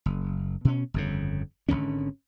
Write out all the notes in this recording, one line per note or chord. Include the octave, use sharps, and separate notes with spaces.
F#1
B2 C#4
G1 F2 C#3
G#1 D#2 D3 C#4